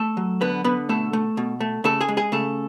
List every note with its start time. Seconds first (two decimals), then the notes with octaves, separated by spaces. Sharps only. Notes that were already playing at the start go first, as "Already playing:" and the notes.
Already playing: A3 A4
0.17 F#3
0.41 D3 B3 B4
0.64 D3 B3 B4
0.89 B2 A3 A4
1.13 A3
1.37 B2
1.60 A3
1.84 C#3 A3 A4
2.01 G#4 G#5
2.08 G#3
2.17 G#4 G#5
2.32 C#3 A3 A4